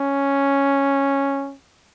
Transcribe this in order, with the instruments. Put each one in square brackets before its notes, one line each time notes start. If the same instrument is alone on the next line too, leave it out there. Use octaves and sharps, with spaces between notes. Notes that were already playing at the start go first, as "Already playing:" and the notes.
Already playing: [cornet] C#4